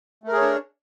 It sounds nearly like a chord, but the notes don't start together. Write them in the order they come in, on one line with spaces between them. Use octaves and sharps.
A3 A#4 G#4 C#5 D4